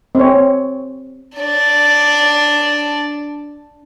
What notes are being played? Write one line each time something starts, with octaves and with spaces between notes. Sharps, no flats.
C4 C#5
D4 D5